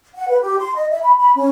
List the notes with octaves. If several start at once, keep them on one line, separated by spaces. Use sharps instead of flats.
F#5
B4
G4
C6
D#5
E5
B5
B5
C#4